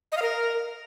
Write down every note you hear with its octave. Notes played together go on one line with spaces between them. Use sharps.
D#5
F5
A#4